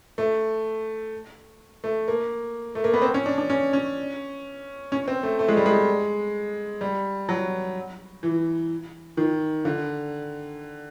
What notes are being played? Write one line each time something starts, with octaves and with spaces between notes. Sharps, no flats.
A3
A3
A#3
A3
A#3
B3
C4
C#4
D4
D4
C#4
C#4
C#4
C4
A3
A3
G#3
G3
G#3
G3
F#3
E3
D#3
D3